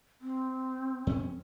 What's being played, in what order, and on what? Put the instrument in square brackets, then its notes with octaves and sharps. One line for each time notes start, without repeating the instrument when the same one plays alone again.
[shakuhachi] C4
[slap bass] F2 C#4